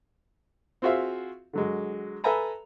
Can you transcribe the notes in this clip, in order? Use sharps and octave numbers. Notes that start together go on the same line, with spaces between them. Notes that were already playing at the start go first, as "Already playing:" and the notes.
C4 F4 F#4 G#4 E5 F5
D3 F#3 G#3
A4 B4 E5 G#5 A#5 B5